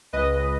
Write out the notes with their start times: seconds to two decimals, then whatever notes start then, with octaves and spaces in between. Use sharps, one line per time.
0.13 C#2 B4 D#5
0.33 C#2